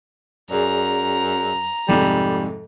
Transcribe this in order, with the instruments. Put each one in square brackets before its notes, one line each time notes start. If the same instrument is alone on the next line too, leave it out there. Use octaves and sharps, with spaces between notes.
[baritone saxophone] F#2 [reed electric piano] G#4 D5 [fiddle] A#5
[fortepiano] F2 G#2 C3 [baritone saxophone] G3 [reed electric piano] A4